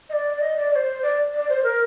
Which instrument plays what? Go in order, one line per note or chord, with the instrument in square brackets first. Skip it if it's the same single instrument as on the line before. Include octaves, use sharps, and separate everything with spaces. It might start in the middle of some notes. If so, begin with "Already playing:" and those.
[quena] D#5
D5
D#5
D5
D5
C5
D5
D5
C5
A#4